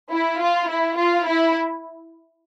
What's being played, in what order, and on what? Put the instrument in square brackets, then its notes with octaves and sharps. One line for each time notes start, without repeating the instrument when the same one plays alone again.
[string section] E4
F4
E4
F4
E4